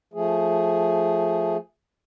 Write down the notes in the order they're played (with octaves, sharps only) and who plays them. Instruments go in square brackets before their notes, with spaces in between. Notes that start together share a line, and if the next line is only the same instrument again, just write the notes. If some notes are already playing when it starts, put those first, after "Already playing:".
[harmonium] F3 A3 G#4